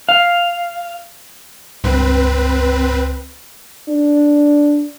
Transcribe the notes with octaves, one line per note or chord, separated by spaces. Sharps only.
F5
C#2 G2 C4 B4
D4